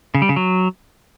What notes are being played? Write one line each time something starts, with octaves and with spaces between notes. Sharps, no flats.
C#3
G3
C#3
F#3